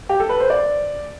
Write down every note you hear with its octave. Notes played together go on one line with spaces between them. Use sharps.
G4
A4
B4
C5
D5